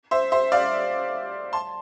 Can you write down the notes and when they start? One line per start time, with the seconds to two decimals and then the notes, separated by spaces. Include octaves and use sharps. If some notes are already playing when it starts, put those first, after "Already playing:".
0.11 C5 E5
0.32 C5 E5
0.52 D5 F5
1.53 A5 C6